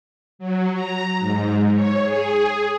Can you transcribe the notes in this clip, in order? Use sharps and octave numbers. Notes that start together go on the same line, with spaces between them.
F#3
A#5
G#2
C#5
G#4